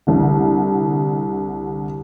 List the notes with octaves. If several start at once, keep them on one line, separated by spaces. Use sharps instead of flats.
C2 D3